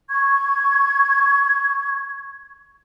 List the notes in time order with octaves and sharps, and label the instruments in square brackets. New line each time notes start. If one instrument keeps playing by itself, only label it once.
[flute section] C#6 G#6